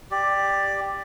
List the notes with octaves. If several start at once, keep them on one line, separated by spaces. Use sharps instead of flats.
G4 D5